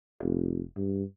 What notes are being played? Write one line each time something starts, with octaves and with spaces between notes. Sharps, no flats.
F1
G2